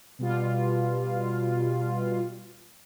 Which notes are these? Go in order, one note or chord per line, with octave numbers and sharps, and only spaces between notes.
B2 G3 F4